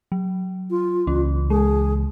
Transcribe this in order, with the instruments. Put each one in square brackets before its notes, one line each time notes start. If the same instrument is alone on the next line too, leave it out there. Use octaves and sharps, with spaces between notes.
[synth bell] F#3
[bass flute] F4
[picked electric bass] C#2 E3 [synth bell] C#4
[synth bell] G#3 [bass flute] G#4